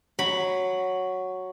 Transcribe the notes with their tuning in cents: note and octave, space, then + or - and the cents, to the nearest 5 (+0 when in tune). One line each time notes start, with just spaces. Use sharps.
F#3 +0 B5 +0